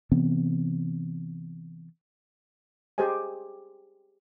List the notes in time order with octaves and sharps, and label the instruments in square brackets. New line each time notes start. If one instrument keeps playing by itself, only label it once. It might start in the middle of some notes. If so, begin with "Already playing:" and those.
[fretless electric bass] C3 E3 B3 C4
[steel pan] G4 G#4 C5 D#5 G#5